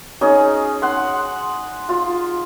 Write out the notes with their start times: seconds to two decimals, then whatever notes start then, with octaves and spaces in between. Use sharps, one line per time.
0.21 C#4 D#4 G#4
0.82 F#5 C6
1.89 F4